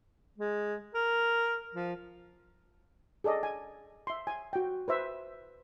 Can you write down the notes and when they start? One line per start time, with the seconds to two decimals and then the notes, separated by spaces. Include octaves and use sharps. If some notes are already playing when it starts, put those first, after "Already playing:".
0.38 G#3
0.95 A#4
1.74 F3
3.24 G#4 A4 D5 D#5
3.43 G#5
4.07 E5 C6
4.27 G#5
4.53 F#4 G5
4.88 B4 C5 E5